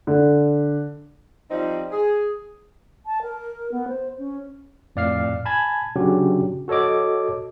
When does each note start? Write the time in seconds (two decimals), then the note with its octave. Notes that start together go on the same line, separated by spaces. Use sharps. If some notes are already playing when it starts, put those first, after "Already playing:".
0.07 D3
1.50 F3 G3 C4 D#4
1.92 G#4
3.06 A5
3.22 A#4
3.72 B3
3.88 C5
4.18 C#4
4.96 F2 A2 D5 F5 F6 C7
5.45 G#5 A5 B5 G#6
5.96 C#3 F#3 C#4 D4 F#4 G4
6.68 F#4 A4 C#5 D#5 D6